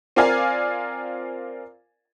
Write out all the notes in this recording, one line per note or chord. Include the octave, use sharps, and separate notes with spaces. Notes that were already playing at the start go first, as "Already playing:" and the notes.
C4 F4 A#4 D5 F5 G#5